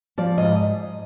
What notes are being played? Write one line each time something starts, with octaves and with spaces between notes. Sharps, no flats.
F3 D5
G#2 D#5